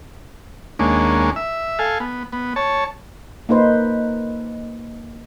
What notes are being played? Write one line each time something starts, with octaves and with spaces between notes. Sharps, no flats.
D#2 G#3 A#3 C#4 D4
E5
A4 F5 G#5
B3
B3
C#5 A5
A#3 D#4 B4 C5